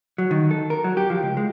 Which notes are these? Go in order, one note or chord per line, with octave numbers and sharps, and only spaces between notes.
F#3
D#3
A4
A#4
F#3
G4
F3
C#2
G#3